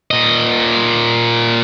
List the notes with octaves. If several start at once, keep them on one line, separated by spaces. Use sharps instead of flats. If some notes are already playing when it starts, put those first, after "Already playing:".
A#2 D#5